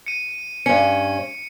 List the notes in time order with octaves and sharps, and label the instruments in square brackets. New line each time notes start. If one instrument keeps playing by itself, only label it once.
[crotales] C#7 D#7
[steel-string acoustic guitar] G2 C#4 [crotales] C#7